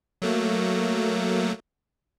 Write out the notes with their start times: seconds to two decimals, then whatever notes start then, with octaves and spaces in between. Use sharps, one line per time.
0.22 F#3 A3 A#3